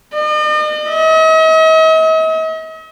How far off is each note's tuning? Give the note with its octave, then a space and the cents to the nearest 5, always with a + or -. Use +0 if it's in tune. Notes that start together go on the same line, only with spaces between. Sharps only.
D#5 -45
D#5 +45